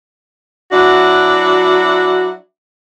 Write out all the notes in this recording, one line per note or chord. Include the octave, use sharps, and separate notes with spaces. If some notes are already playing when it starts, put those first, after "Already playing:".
F#3 D4 E4 F#4